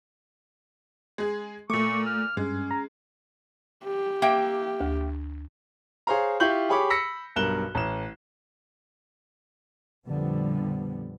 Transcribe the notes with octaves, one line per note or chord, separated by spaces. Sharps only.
G#3 G#4
A#2 A3 C#6 D6
F6
G2 G#3 C#4
A#5
G4
A#3 E5 G5
D2
G#4 C5 C#5 F5 A#5
E4 F4 G4 C#6 G6 F#7
G4 G#4 C#5 B5 C#6 D6
B5 E6 A#6 B6 C#7
B1 G2 A#4 F#6 E7 G7
A1 E7
F2 A#2 D3 F3 G3 B3